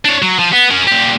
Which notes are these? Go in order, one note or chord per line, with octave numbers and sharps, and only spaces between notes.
D4 C#5
F#3
F3
B3
C#4 A#4
A#2 G4